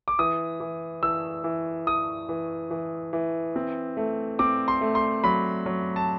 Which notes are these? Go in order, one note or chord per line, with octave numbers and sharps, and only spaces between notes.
D6
E3 D#6
E3
E3 E6
E3
E3 D#6
E3
E3
E3
C4
A3
C4 D6
C6
A3
C6
F#3 B5
F#3
A5